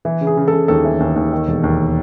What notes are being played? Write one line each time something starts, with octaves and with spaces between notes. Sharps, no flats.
E3
C#3
G#4
C#3
A4
C#3
D#2 A4
E3
D#2
D#2
D#3
E1
D#2